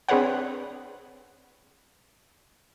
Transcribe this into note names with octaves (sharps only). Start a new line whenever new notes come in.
C4 D4 G#4 B4 C#5 F#5